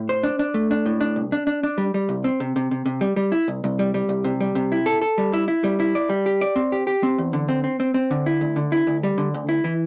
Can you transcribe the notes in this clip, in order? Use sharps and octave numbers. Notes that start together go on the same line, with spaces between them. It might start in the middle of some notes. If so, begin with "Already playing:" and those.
Already playing: A2
C5
D4
D4
A3
D4
A2
D4
C2
D4
D4
D4
G3
G3
C2
C4
C3
C3
C3
C3
G3
G3
E4
C2
C2
G3
G3
C2
C3
G3
C3
E4
A4
A4
G3
E4
E4
G3
E4
D5
G3
G4
D5
C4
G4
G4
C4
E2
D3
C4
C4
C4
C4
D3
E4
D2
D3
E4
D2
G3
D3
D2
E4
E3